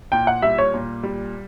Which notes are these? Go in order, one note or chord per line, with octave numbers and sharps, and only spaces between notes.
A#2 G5
F#5
G3 E5
C#5
A#2
G3